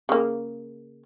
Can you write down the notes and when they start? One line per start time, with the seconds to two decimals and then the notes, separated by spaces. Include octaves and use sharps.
0.09 C#3 A#3